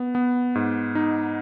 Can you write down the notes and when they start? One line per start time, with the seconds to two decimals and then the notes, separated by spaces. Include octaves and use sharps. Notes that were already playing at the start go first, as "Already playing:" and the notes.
Already playing: B3
0.15 B3
0.55 G#2
0.95 D#4